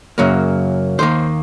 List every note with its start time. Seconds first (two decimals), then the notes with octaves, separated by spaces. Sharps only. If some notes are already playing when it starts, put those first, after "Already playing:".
0.18 F#2 C#3 F#3 A#3
0.99 D#2 D#3 A#3 C5